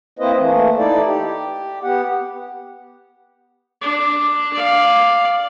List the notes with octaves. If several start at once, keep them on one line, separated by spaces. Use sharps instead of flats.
A#3 C4 E4 B4 C5 D#5
E3 A3 A#3
D#4 E4 A4 D5
G4
B3 G4 F#5
D4
D5 F5